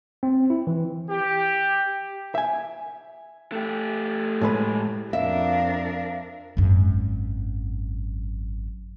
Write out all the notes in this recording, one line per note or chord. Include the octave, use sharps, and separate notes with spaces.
C4
E4
E3
G4
E5 G#5
A3 G4
A2 G#3 B4
F2 D4 A#4 E5 F5
G#1 F#2